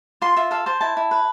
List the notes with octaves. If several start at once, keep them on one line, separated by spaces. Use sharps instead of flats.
F4 C6
F4 E5
A4 F5
C5 A5
E4 A5
E4
B4